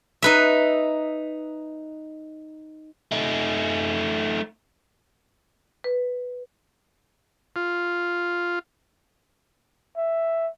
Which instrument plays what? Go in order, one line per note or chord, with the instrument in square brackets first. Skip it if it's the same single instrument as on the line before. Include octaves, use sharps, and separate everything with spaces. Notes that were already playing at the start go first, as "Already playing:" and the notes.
[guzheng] D#4 B4 E5
[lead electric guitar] A3 D#4
[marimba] B4
[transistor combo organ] F4
[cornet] E5